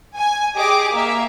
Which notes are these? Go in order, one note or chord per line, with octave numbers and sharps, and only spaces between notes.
G#5
G4 G#4 D#5 D6
A#3 E5